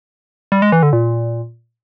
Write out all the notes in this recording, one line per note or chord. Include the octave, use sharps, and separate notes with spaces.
G3
G#3
E3
D3
A#2